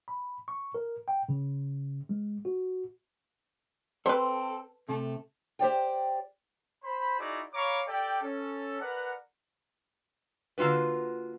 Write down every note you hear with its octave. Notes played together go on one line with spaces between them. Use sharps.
B5
C#6
A#4
G5
C#3
G#3
F#4
C4 A4 B4 C5
C3 A3
G4 C5 D5 G5
C5 B5
D#4 E4 F#4 G#4 D5
C#5 F5 A#5 B5 C#6 D6
G4 A4 D5 G5
C#4 A4
A#4 B4 D5 F#5
D3 A#3 F4 F#4 B4